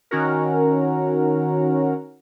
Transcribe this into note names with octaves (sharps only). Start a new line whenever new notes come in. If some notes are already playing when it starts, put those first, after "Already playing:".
D#3 C#4 F#4 A#4